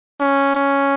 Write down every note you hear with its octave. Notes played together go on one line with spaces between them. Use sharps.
C#4
C#4